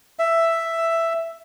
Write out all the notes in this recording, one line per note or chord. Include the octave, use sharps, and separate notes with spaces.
E5